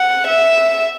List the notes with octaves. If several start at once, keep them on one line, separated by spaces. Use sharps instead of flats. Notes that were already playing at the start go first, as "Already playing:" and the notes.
Already playing: F#5
E5